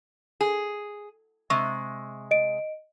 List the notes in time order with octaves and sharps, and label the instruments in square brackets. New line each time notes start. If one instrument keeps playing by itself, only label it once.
[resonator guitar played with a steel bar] G#4
[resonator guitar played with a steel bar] C3 G#3 [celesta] C#6
[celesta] D#5 D7